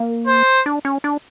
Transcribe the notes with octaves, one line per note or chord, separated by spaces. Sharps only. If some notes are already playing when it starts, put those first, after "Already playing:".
Already playing: A#3
C5
D4
C#4
D4